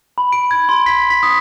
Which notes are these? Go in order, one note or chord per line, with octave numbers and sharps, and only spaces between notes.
B5
D7
G#6
C6
B6
B6
D#6